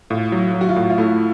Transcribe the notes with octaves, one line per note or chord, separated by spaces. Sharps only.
A2 F4
F#3
F#3
F#4
F4
A2
F4
A3 E4